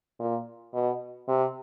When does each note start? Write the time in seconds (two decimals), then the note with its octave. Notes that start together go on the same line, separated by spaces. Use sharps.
0.20 A#2
0.74 B2
1.28 C3